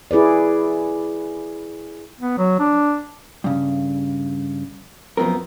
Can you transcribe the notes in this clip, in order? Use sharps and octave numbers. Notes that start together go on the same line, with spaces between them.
E4 G#4 B4 D5
B3
F#3
D4
G2 C#3
F#2 F3 B3 C4 A#4